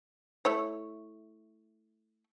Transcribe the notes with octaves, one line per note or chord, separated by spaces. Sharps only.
A3 E4 C#5